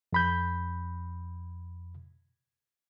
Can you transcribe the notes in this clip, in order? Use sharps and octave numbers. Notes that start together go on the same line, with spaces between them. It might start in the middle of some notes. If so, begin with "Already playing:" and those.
F2 B5 G6